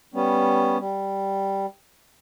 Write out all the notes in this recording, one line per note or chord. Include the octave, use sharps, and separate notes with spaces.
G3 B3 C#4
G3